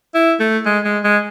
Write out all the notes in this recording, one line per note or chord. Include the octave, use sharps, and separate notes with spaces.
E4
A3
G#3
G#3
G#3